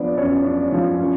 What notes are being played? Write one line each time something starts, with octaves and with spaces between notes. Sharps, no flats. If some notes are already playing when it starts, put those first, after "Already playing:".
Already playing: F3 B3 D4 D5
F#2 C#4 C#5
D4
F3
C#4